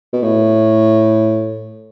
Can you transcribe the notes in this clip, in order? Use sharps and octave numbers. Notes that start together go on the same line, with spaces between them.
B2
A2